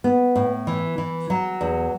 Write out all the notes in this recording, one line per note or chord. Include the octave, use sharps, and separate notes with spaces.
B3
A2
E3
E3
F#3
E2